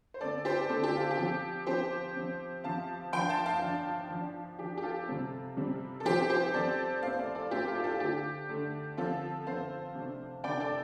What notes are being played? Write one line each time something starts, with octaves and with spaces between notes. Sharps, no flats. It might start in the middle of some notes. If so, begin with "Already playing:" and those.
C5
D3 A3 C4 A4 D5
G4 C5
D3 A3 C4 A4
G4
F4
G4
F3 C4
F3 C4 G4 C5
F3 C4
F3 C4 F5 A5
F3 D4 G5 C6
F5 A5
F5 A5
F3 D4
F3 D4
F3 D4 G4
G4
F4 A4
C3 G3 C4
C3 G3 C4
A4
F3 C4 G4 C5
G4 C5
F3 C4 A4 D5
A2 A3 C4 C5 F5
A4 D5
A4 D5
A2 A3 C4 G4 C5
F4 A4
G4
F4 A4
D3 A3 D4 G4
D3 A3 D4
D3 F3 C4 F4 A4
D3 F3 C4 C5 F5
C3 A3 D4
C3 A3 D4 D5 G5
A4 D5